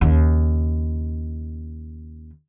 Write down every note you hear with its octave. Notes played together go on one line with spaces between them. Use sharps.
D#2 C#3